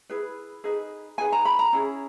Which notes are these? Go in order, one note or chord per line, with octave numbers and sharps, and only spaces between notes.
E4 G#4 B4
D#4 G#4 B4
D#4 G#4 B4 G#5
A#5
B5
A#5
C#4 E4 G#4